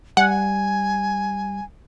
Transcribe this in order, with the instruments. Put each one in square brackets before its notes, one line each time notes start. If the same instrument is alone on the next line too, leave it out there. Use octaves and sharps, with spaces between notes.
[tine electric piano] G3 [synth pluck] F#5 [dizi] G#5